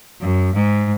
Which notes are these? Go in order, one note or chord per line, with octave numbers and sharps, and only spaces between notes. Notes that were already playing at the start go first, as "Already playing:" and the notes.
F#2
G#2